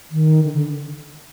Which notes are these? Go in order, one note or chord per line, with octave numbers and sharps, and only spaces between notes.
D#3
D3
D3